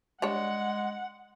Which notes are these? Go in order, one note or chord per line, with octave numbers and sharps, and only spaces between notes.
G3 G#3 D4 C#5 F#5